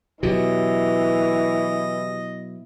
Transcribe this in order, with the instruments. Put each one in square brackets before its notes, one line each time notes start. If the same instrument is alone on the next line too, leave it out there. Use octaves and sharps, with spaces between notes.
[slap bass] B2 F#3 [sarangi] E3 [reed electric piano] G4 [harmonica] D#5